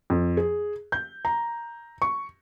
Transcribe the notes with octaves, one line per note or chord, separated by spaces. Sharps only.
F2
G#4
G6
A#5
C#6